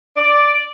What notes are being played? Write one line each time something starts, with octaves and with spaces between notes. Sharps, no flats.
D5